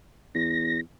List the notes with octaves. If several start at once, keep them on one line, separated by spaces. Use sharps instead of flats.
E2 A#6